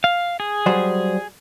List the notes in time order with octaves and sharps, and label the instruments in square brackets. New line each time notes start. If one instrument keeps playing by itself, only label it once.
[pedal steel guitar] F5
G#4
[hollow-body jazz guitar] F#3 G3 C5